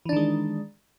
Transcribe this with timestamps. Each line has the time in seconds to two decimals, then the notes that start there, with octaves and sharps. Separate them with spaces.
0.05 E3
0.09 D4
0.13 D#3
0.16 G#3